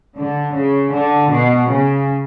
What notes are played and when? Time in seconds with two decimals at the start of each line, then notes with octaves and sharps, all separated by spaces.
0.16 D3
0.55 C#3
0.93 D3
1.31 B2
1.70 C#3